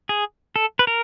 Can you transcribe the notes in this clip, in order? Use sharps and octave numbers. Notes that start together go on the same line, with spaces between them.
G#4
A4
B4
A#4